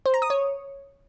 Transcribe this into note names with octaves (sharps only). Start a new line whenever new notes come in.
C5
A#5
D#6
C#5